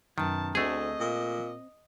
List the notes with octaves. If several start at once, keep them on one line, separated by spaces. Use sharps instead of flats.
F#2 B2 D#3 A5
D2 A3 C4 G#4 D#5
A#2